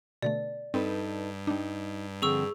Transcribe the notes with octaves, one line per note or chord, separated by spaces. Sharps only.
B2 D3 A3 D5
G2 C4 D#4 A4 B4
G3 D4 D#4
D3 F3 C4 G#4 C#6 E6